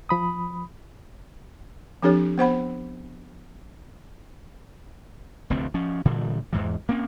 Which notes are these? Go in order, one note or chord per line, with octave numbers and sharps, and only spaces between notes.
F3 B5 D#6
F3 C4 D4 G4 A4 C#5
B3 C5 F#5 B5
F1 D2 A2 C4
F3 C#4
A#2 D3 E3 G3
E2 G#2 E3
A#3 C4 C#4